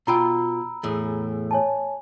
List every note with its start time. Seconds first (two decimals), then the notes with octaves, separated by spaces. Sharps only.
0.07 B2 F4 G5 A#5 B5 E6
0.83 E2 A2 G#4
1.51 C#5 G#5 A5